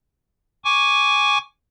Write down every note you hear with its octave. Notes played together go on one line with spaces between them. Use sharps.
G#5 C#6 D6